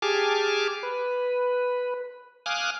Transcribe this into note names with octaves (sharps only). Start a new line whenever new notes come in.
G4 G#4 G#5 A5 D6 F6
B4
F5 G#5 D6 D#6 F6 F#6